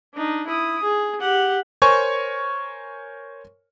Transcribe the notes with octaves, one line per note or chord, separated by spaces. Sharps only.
D4 D#4
E4 D#6
G#4
G4 F#5
A#4 C5 C#5 G#5 C#6